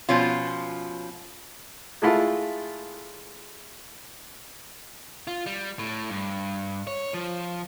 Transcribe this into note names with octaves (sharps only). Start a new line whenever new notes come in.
B2 F3 C#4 F4
G#3 A3 E4 F4
F4
G3
A2
G2
C#5
F3